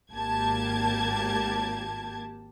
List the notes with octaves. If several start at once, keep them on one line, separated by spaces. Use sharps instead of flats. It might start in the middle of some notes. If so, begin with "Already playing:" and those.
G#1 A#3 G4 A5 G#6